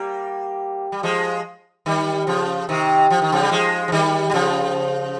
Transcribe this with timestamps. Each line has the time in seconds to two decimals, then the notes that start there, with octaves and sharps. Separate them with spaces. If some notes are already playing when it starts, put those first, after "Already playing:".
Already playing: G3 A#3
0.92 G3
1.03 F3 G#3
1.86 D#3 G3
2.27 C#3 F3
2.69 C3 D#3
3.10 F3
3.22 D#3
3.32 C#3 F3
3.42 G3
3.51 F3 G#3
3.88 F3
3.92 D#3 G3
4.30 G3
4.34 C#3 F3